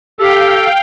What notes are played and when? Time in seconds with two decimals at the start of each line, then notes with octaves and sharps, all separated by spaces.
0.19 G4 A4 F5 G5